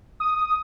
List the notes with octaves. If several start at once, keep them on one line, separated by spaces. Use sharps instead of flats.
D#6